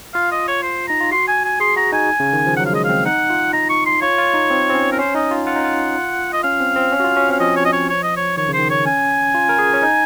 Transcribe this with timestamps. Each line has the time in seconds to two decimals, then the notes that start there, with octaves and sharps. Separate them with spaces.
0.14 F4 F5
0.31 D#5
0.48 C#5
0.63 C5
0.88 D#4 A#5
1.00 F4
1.11 F#4 C6
1.28 G#5
1.44 G#5
1.60 G#4 C6
1.76 F#4 A#5
1.93 D#4 G#5
2.20 C#3
2.33 D#3
2.46 F3
2.57 F#3 F#5
2.66 F5
2.73 G#3 D#5
2.84 C4 F5
3.05 D#4 F#5
3.30 F4
3.53 D#4 A#5
3.70 C#6
3.86 C6
4.01 F4 C#5
4.18 F4
4.34 D#4
4.50 C4
4.70 C4
4.74 C#4
4.92 A#4
4.99 C#4 C5
5.15 D#4 D#5
5.31 F4
5.47 F4 F#5
5.56 D#4
5.64 F4
6.33 D#5
6.43 C#4 F5
6.60 C4
6.76 C4
6.92 C#4
7.00 F#4
7.04 F4
7.17 C#4
7.29 C4 F5
7.40 F3 D#5
7.56 C#5
7.65 D#5
7.73 C#5
7.90 C#5
8.03 D#5
8.17 C#5
8.37 D#3 C#5
8.48 C#3
8.53 C5
8.58 D#3
8.70 C#5
8.85 C#4 G#5
9.35 F4
9.49 A#4
9.59 G#4
9.73 C#4
9.83 D#4